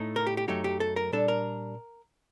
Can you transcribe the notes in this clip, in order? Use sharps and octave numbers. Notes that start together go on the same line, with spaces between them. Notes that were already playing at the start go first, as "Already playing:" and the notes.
Already playing: A2 A3 D#4
A#4
G4
G4
F#2 F#3 A3 D#4 G4
G4
A4
A#4
A#2 G3 D4 A4
A#4